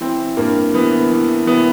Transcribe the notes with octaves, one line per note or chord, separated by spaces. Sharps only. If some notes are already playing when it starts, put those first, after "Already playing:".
E3 C4
G2 A#3
E3 B3
E3
E3 B3